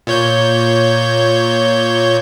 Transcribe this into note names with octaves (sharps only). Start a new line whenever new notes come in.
A#2 C#5 G6